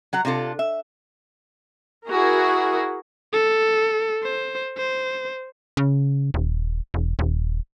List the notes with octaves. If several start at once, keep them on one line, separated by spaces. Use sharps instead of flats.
F#3 F#5 A#5
C3 D4 F4 A4
E5
E4 F#4 G#4 A#4
A4
C5
C5
C#3
D#1
E1
D#1